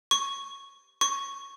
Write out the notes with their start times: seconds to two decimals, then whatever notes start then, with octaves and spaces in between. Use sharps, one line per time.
0.11 C#6
1.01 C#6